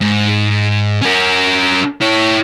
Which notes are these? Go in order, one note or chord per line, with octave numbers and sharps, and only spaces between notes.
G#2
C#4 A#4
E4 C#5